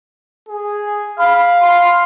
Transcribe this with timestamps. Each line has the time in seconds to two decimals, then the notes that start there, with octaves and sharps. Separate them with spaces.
0.49 G#4
1.19 F5 B5
1.62 C6